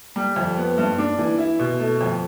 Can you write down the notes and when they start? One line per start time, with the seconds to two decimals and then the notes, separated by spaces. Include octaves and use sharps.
0.16 G3
0.36 F2
0.57 B3
0.78 G2
0.98 D4
1.19 E3
1.38 E4
1.59 B2
1.80 A3
2.01 F2